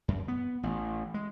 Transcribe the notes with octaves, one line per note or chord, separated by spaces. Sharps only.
F#2
B3
A1
G#3